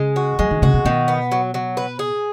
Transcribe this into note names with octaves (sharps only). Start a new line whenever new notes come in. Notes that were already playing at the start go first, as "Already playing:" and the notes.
Already playing: C#3 G#3
F#4
F#3 G#3
D#3
C#3 F#4
B2
B2 D#3
B3
F#3
F#3
B4
G#4